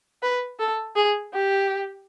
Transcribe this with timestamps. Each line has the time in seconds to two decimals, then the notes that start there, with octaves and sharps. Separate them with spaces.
0.23 B4
0.60 A4
0.96 G#4
1.33 G4